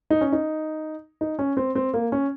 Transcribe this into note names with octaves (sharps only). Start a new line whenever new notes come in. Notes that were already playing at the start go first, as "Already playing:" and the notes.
D#4
C#4
D#4
D#4
C#4
C4
C4
A#3
C#4